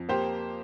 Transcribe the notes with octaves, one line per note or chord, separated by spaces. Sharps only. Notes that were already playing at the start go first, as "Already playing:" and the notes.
Already playing: F2
A#3 G4 C5